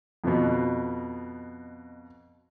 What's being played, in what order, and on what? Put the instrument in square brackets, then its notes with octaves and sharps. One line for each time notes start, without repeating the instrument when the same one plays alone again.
[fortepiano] F2 B2